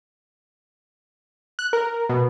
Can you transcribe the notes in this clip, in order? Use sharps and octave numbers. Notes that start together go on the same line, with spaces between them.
F#6
A#4
B2